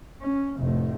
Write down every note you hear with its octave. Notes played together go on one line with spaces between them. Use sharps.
C#4
F1 A2